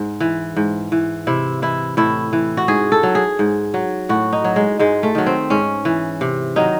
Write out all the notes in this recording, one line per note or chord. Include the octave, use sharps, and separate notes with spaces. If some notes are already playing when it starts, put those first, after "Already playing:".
Already playing: G#2
E3
G#2
E3
C3 E4
E3 E4
A2 E4
E3
F#4
G#2 G#4
A4
F#3
G#4
G#2
F#3
A2 F#4
D#4
F#3
G#3
G#2 G#3
A3
D#3 F#3
C4
G#2 C#4
E3
C3
D#3 F#3 D#4